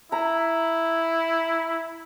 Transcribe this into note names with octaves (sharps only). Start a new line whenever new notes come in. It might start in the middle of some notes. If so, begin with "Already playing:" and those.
E4 A#5